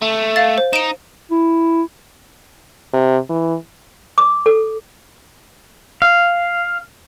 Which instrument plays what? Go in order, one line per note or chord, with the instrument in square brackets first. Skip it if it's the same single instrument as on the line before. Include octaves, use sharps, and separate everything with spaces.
[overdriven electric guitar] A3
[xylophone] F5 A6
C5
[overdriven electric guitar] D#4 [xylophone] D7 E7
[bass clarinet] E4
[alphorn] C3
E3
[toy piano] D6
A4
[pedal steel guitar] F5